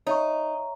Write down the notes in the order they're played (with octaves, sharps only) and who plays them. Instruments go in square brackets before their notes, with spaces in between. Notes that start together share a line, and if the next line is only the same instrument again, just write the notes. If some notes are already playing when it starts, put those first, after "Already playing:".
[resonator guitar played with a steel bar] D#4 [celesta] C#5 E5 A#5 C#6